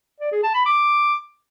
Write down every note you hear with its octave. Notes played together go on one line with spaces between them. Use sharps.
D5
G#4
A5
B5
D6